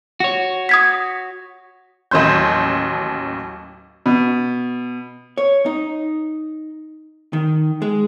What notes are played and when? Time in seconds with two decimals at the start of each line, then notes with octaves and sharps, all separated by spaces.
0.20 F#4 C#5
0.69 D#6 G#6 B6
2.11 A1 D#2 F#3 C#4 C6 G6
4.06 B2
5.38 C#5
5.66 D#4
7.33 D#3
7.82 G#3